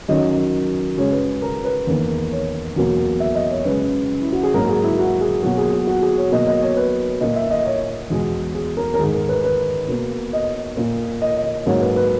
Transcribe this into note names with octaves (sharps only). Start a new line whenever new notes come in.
F#2 D#3 F#3 D#5
F#2 C#3 G#3 C#5
B4
A#4
B4
E2 D#3 A#3
C#5
E2 B2 F#3 A#3
E5
D#5
C#5
F#2 C#3 G#3 B4
E4
F#4
G#4
G#2 F#3 A#3 A#4
G#4
E4
F#4
G#4
B2 F#3 A#3 F#4
G#4
F#4
F#4
G#4
C#5
B2 F#3 A#3 D#5
D#5
C#5
B4
A#2 A#3 D#5
E5
D#5
C#5
E2 B2 G#3
G#4
A#4
A#4
G#2 D#3 G#3 G#4
A#4
B4
B4
B2 A#3
D#5
A#2 A#3
D#5
D#5
G#2 F#3 A#3 C#5
B4
B4